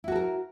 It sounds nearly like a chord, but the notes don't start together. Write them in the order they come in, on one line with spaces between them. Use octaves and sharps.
E4 F#4 A4 A#4